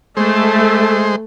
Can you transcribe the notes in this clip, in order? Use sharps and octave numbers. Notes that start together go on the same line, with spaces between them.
G#3 A3 C5